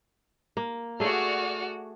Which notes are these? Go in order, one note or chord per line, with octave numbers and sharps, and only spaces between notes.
A#3
A3 F#4 G#4 D5 F6